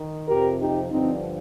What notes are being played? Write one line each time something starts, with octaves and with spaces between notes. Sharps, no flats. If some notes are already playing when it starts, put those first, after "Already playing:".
Already playing: D#3
F2 C3 F3 G4 A#4
D#4 G4
G2 D3 F3 C4 D#4